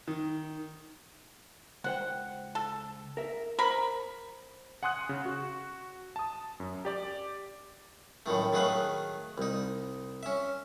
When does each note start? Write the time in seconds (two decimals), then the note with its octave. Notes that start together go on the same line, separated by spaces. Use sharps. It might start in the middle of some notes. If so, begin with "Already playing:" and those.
0.08 D#3
1.84 C#2 C5 F#5 G5
2.55 A4
3.17 A#4 E5
3.59 A#4 C5 B5
4.83 F#5 G#5 C6 D#6 F#6
5.09 C#3
5.26 F#4
6.16 A5 D#6
6.60 F#2
6.85 G4 D5 D6
8.26 F#2 A2 D#3 A3
8.53 D#3 F#3 A3 G#4 B4 F5
9.38 C2 D#4
10.23 C#4 E5